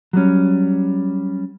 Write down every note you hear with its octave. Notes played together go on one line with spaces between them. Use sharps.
F#3 G3 C#4